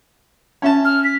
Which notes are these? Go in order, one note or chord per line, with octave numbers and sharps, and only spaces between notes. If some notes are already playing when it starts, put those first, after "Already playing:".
C#4 E5 A5
F6
B6